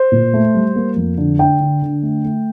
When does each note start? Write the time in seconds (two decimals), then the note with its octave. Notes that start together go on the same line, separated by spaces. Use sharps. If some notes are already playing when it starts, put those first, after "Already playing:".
Already playing: C5
0.12 A#2
0.34 A3
0.54 G3
0.76 A#3
0.96 F2
1.18 D3
1.39 D4 G5
1.60 D3
1.82 D3
2.03 A3
2.24 A3